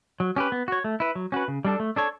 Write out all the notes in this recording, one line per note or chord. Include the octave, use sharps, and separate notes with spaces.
F#3
C#4 G4 B4
B3
F#4 C#5
A3
E4 B4
F#3
C#4 F#4 B4
C#3
G3 D4 A4
A3
D4 A4 C#5